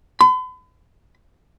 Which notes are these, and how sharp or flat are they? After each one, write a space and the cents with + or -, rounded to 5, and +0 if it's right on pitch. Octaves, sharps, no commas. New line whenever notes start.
B5 +45